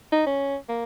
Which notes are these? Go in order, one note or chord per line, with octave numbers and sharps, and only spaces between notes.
D#4
C#4
A#3